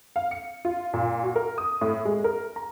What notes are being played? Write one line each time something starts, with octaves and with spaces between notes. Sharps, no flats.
F5
C#7
F4
A#2
F#4
A#4
D#6
A2
G#3
A#4
A#5